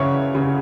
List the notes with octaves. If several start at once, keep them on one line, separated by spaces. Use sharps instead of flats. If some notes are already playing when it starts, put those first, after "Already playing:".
Already playing: F#2 C#3 E3 C#5 D5 E5 F#5
C#3